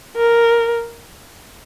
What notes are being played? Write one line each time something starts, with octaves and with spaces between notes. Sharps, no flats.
A#4